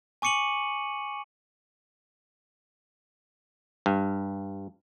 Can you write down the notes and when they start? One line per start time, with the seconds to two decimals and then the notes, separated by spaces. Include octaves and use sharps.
0.22 G#5 C#6 D6 C#7 D#7 F#7
3.86 G2